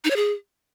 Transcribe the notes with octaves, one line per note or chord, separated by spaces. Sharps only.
D#4
C#5
G#4